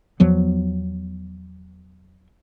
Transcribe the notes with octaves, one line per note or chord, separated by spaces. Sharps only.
E2 F3 F#3 B3